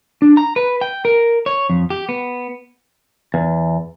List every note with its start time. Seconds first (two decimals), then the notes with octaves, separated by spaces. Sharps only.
0.22 D4
0.37 A#5
0.56 B4
0.81 G5
1.05 A#4
1.46 C#5
1.70 F2
1.90 G4
2.09 B3
3.34 E2